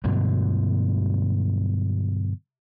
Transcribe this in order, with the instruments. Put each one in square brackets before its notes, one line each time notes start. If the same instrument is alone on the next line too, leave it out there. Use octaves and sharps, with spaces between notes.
[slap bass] G2 B2 D3 F#3